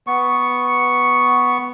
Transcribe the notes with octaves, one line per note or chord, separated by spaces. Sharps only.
B3 C#6